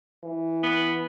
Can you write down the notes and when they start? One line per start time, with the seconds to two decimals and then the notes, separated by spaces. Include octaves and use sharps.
0.23 E3
0.63 B3